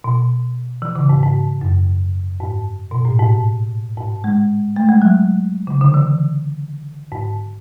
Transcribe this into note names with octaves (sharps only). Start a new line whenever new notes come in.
B2
E3
C#3
G#2
G#2
F#2
G#2
B2
A2
G#2
G#2
G#3
A3
G#3
F#3
C#3
D3
E3
G#2